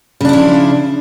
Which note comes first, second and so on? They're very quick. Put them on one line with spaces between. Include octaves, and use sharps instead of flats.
C#3 D4 E4 F3